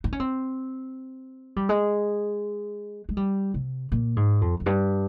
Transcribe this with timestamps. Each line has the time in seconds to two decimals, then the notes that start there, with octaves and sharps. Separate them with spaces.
0.04 D#4
0.13 C#4
0.20 C4
1.56 G3
1.69 G#3
3.09 G#3
3.17 G3
3.54 C3
3.92 A#2
4.16 G#2
4.41 F2
4.60 F2
4.66 G2